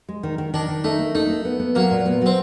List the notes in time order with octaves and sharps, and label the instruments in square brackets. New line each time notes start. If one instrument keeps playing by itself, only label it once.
[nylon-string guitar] G#3
D#3
D#3
[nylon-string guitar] D#3 [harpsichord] D4
[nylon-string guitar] D#3
[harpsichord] A3 [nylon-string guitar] D#4
[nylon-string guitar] A#3
[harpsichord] A3 [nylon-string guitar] D#4
[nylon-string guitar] A#3
B3
B3
[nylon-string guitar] F#3 [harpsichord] A#3
[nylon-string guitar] A#2
B3
[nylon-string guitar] F#3 [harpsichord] C4